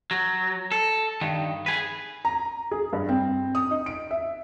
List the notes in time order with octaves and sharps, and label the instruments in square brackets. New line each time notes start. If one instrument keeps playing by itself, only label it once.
[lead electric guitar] F#3
A4
G2 D#3
G#4 B4
[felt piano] A#5
G#4
G2
C4
D#6
D#4
D7
E5